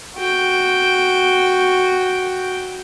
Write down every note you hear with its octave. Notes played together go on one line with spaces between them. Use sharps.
F#4 G5